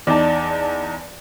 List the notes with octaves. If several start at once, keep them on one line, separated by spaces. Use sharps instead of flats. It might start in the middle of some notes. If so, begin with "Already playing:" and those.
E2 D#4 D5 A5